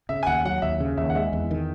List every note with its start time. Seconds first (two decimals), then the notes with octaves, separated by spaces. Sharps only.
0.09 C#3 E5
0.23 G#5
0.27 D#2 F#5
0.45 F#3 F#5
0.62 D#2 E5
0.80 C#3
0.97 D#2 E5
1.10 F#5
1.15 G#3 E5
1.33 E2
1.51 D#3